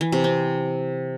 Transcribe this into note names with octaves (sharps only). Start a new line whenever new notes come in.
E3
C3
C4